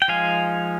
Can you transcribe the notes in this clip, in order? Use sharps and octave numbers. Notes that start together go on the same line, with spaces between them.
G5
F3 G#3 D#4 F5 G#5